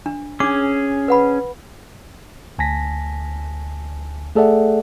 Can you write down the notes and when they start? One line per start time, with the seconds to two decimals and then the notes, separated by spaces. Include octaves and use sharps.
0.06 D4
0.40 C#4 D4 G#4 D6
1.08 B4 F#5 B5
2.59 D2 G#5 A5 A#6 B6
4.35 A3 G#4 A4 D5 E5 F#5